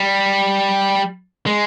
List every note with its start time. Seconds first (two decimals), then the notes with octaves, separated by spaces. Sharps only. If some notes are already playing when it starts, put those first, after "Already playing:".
Already playing: G3
1.46 G#3